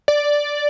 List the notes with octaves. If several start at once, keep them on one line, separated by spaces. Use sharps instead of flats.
D5